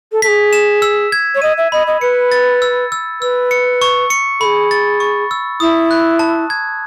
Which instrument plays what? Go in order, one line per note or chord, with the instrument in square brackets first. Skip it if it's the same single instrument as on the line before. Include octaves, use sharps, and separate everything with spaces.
[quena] A4
[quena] A4 [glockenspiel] B6
[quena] G#4
[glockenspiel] E7
E6
G#6
[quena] C#5
[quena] D#5 [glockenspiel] D#7
[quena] E5
[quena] D#5 [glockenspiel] B5
[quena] D#5
[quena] B4 [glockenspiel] C#7
[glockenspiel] A6
E6
E6
[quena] B4 [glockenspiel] E6
[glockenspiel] C#7
C#6
C#7
[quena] G#4 A4 [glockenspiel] B5
[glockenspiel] A6
C#6
E6
[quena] E4 [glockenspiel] D#6
[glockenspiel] F#6
A5
G#6